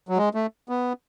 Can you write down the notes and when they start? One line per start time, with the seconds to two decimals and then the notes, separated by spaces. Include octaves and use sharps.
0.09 F#3
0.17 G#3
0.35 A3
0.69 B3